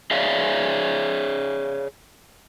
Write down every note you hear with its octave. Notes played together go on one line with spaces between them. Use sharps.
G#4 C#5 D5 E5 F5